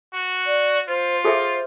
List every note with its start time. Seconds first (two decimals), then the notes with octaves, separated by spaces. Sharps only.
0.13 F#4
0.46 D5
0.88 F4 C5
1.25 G#4 A4 C5 E5